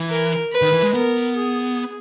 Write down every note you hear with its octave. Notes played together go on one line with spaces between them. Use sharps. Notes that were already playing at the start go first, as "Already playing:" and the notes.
Already playing: E3
A#4
B4
D#3
E3
G#3
B3 A#4
G#4